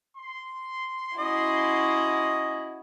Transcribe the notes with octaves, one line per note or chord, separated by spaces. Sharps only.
C6
C#4 E4 F#4 D#5